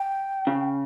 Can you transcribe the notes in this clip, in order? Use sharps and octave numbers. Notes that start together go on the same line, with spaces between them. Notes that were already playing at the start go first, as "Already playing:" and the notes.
Already playing: G5
C#3